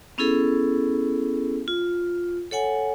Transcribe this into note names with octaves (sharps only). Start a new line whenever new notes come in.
B3 C#4 E4 G#4 A4
F4
A4 C#5 F#5 G#5